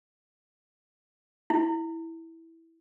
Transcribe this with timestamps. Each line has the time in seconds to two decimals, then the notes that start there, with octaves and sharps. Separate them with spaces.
1.50 E4